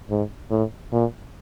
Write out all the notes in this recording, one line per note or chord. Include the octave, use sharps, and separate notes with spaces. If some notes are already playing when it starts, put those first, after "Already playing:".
G#2
A2
A#2